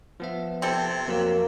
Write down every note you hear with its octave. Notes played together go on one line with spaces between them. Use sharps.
F3 B3 E5
C3 C4 A4
F2 F#3 A#3 E6